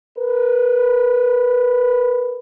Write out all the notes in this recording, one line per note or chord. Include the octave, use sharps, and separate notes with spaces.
A#4 B4